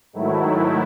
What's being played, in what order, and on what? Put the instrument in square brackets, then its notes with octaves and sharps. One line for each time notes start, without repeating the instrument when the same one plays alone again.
[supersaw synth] G#2 D#3 F#3 A3 E4